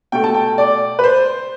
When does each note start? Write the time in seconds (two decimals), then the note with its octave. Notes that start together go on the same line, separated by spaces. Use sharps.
0.12 B2 A3 G5
0.24 A5
0.34 G5
0.58 D5
0.99 B4
1.04 C5